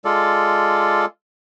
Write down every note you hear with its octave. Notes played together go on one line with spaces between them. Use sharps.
G#3 F4 A4 D5